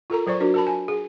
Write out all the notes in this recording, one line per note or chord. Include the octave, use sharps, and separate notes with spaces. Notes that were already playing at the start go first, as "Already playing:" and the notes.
F4 A4 A#4 A#5
F#3 C5 D5 C#6
D4 F#4 A#4
A#4 A5 B5
G#5
G#4